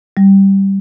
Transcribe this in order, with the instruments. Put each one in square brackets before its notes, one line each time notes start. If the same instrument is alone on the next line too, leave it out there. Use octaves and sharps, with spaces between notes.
[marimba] G3